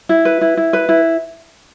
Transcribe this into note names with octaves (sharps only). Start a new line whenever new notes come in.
E4
B4
E4
E4
B4
E4